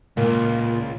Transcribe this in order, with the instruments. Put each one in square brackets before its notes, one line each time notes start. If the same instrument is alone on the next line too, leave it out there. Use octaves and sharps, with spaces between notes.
[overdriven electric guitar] C#2 [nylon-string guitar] A#2